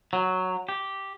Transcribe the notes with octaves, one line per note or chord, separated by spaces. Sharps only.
F#3
G4